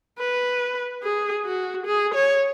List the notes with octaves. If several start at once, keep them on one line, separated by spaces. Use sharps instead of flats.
B4
G#4
F#4
G#4
C#5